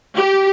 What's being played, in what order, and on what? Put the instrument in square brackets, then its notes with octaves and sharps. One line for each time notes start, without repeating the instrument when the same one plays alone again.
[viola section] G4